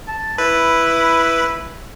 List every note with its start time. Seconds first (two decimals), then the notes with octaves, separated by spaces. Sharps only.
0.08 A5
0.38 E4 B4